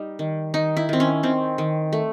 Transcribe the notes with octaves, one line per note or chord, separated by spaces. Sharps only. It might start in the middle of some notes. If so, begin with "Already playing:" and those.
Already playing: G3 D#4
D#3
D#3 D#4
E4
D#3 C4
C#4
D#3 C4
D#3
A3